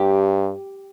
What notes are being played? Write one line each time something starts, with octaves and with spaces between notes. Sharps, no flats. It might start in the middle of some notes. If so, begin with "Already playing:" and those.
Already playing: G2 G4